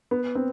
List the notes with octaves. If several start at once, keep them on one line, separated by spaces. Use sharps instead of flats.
B3
C4